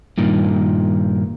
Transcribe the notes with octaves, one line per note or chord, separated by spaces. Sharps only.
G2 A#2 D#3